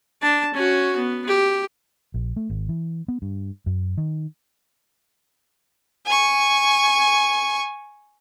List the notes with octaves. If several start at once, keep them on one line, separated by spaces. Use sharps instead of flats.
D4 A5
C#4 F#4
B3
G4
A#1
A3
G#1
E3
B3
G2
F#2
D#3
G#5 C#6